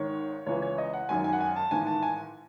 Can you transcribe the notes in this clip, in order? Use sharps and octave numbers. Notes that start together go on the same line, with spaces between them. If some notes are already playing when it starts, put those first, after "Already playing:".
Already playing: G#1 G#2 D#3 C#5
C#2 C#3 E3 C#5
C#5
D#5
F#5
G#1 F#2 D#3 G#5
G#5
F#5
G#5
A5
A1 G#2 D#3 G#5
A5
G#5